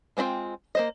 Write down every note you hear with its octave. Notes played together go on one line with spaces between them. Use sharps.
G#3 C4 D4 F4 G5
A#3 C5 D#5